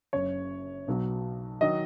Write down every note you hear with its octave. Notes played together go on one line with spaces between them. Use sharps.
F#1 F#2 C#3 C#5
B1 B2 F#3
D#3 F#3 D#5